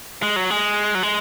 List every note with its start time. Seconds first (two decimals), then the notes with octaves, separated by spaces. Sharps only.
0.22 G#3
0.36 F#3
0.50 G#3
0.95 F#3
1.03 G#3